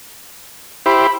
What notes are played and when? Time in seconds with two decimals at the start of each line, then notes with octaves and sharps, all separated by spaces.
0.86 E4 G4 C5 B5